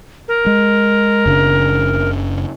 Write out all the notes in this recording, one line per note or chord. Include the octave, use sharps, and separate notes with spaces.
A#4
G#3
F#1 C#3 D4